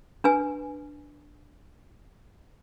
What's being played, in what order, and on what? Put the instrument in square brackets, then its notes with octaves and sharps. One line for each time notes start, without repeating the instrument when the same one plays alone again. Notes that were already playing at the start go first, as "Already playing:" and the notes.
[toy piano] D4 B4 G#5